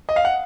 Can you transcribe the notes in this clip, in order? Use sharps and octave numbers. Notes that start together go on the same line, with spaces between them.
D#5
F5
F#5